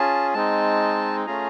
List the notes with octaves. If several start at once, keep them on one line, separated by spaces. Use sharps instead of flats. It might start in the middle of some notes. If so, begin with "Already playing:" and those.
Already playing: C#4 F4 G#4 A5
G#3 C4 D#4 A5
A3 C#4 F4 G#4 A#5